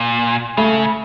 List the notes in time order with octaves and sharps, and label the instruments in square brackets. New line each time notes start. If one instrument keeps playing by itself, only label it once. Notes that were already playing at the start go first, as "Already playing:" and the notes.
Already playing: [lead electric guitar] A#2
[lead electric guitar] C#3 [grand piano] A3